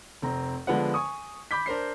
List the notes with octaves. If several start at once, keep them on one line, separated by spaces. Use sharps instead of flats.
F1 C4 A#5
D3 F3 G#3 B3 B4 F#5
G#5 C#6 D#6
B5 D6 G6 B6
D4 A#4 C5 C7